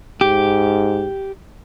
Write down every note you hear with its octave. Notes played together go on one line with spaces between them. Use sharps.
G#2 G4